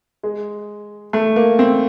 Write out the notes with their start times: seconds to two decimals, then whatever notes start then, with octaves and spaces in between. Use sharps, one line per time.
0.23 G#3
1.13 A3
1.36 A#3
1.59 C4